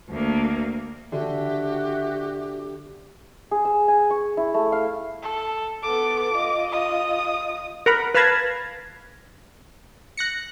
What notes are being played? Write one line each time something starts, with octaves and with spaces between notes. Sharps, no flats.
D2 A#3
D3 F#4 G4 E5
G#4
E6
G#5
C#6
E4
A3
F5
A4
B3 A4 D6
F4 D#5
D#6
A#4 F#5 A#5 B5
B4 F5 A5 B5 G#6 A#6
F#6 A#6 C#7